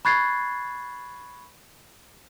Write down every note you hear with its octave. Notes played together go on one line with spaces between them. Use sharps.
B5 C#6 F#6 G#6 A6 C7